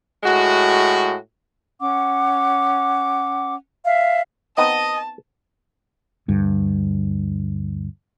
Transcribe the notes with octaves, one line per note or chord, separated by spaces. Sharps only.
A2 G#3 F#4
C#4 F#5 D6
E5 F5
B3 C4 D#4 D#5 A5
D2 G2